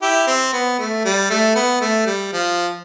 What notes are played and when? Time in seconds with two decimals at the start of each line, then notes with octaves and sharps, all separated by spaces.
0.02 E4 G4
0.27 C4
0.53 B3
0.79 A3
1.05 G3
1.30 A3
1.55 B3
1.81 A3
2.06 G3
2.33 F3